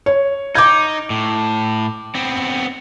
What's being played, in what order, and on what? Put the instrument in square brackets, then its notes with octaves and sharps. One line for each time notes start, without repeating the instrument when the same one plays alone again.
[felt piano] C#5
[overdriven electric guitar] D#4 [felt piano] D6 G6 G#6
[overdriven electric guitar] A2
B3 C4